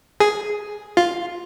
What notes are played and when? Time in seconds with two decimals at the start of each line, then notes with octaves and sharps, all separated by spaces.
0.20 G#4
0.97 F4